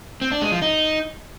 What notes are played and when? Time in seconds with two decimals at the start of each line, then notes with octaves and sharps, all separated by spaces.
0.22 C4
0.32 D4
0.42 G#3
0.52 F3
0.62 D#4